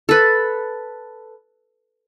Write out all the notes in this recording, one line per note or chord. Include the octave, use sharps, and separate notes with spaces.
A4 B4